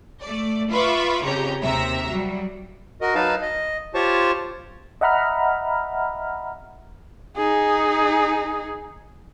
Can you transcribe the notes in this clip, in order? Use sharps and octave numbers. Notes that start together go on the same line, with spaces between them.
A3 D5
F4 B4 E5 B5 C#6 D6
F2 C#3 G4 C#5 A#5
D#2 C3 E5 A#5
F#3 G3
F#4 A#4 D#5
F#3 D#4 B4 F5 A5
D#5
F4 G4 C5 C#5 A5 C#6
D#5 E5 F#5 A#5 B5 F6
D#4 G#4